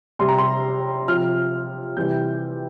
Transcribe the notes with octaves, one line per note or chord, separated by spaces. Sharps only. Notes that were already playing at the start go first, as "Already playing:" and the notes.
C3 G3 C6
A#5
C6
C3 F3 F6
C3 E3 G3 G6